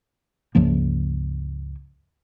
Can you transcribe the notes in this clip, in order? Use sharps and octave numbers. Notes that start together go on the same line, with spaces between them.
C#2 G2 F3 A#3